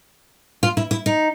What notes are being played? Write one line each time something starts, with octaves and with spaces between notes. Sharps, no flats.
F4
E4
E4
D#4